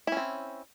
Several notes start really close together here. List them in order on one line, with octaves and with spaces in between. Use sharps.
E4 C#4 C4